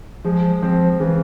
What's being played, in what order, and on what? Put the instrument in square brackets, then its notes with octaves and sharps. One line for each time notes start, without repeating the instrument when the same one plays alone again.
[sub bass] F3 [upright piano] G#3
[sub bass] F3 [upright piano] C4
[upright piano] C#3 [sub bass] E3